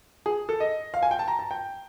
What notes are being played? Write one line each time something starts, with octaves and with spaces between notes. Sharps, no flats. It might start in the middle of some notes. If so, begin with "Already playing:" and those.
G#4
A4
D#5
F5
G#5
G5
A5
A#5
A5
G5